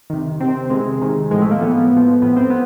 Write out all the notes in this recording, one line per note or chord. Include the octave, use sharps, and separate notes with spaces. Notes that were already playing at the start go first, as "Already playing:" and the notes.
C3 D#3
C3 D#3 C4
C3 D#3 G#3
C3 D#3
A2 F3 G#3
A3
A#3
A2 F3 B3
A2 F3
A2 F3 B3
C4
B3